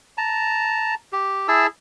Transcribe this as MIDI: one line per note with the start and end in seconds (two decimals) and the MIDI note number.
0.18 0.94 81
0.18 0.94 82
1.12 1.47 67
1.48 1.67 64
1.48 1.67 68
1.48 1.67 81
1.48 1.67 88